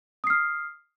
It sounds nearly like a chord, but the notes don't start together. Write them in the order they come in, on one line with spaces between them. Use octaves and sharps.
D#6 C7 F6